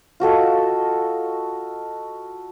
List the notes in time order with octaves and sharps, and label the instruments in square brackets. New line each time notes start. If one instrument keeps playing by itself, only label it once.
[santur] F4 F#4 A4 D#5